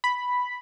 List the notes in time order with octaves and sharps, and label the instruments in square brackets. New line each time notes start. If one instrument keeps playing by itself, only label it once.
[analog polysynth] B5